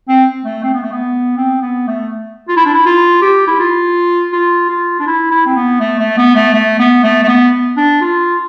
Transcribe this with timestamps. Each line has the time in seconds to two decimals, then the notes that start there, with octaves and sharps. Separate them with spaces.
0.08 C4
0.45 A3
0.64 C4
0.74 B3
0.83 A3
0.92 B3
1.37 C4
1.62 B3
1.87 A3
2.48 F4
2.57 E4
2.66 D4
2.74 E4
2.86 F4
3.22 G4
3.47 E4
3.59 F4
4.33 F4
4.70 F4
5.00 D4
5.07 E4
5.31 E4
5.46 C4
5.56 B3
5.80 A3
5.99 A3
6.17 B3
6.36 A3
6.54 A3
6.80 B3
7.04 A3
7.24 A3
7.28 B3
7.77 D4
8.02 F4